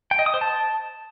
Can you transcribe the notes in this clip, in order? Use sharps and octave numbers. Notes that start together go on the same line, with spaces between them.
G5
D#5
D#6
C5
A5